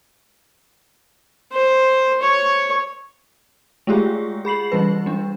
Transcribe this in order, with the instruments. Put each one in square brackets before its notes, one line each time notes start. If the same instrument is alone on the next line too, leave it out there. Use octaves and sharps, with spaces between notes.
[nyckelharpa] C5
C#5
[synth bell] G#3 A3 F4 G4 G#4
G#4 B5 C7 F#7
E3 G3 B4
G3 D4